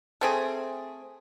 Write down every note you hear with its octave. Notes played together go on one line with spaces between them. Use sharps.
A3 C4 G#4